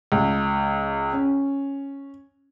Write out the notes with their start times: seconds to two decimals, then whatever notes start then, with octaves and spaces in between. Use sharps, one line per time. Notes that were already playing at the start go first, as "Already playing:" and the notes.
0.12 C#2
1.13 C#4